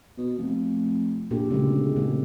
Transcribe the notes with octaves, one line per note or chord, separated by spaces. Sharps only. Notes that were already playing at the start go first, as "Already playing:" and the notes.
B2
F1
A#1 A#2 G4 A4
D1 C#3 G#3
G#1 A#2